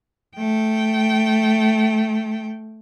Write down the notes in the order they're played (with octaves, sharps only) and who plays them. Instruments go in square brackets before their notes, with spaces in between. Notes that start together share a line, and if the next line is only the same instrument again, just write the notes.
[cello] A3 G5